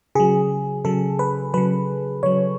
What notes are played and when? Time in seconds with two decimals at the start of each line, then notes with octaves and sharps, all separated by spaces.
0.15 C#3 F#3 G#4
0.85 C#3 F#3 A4
1.19 B4
1.54 C#3 F#3 B4
2.23 C#3 F#3 C#5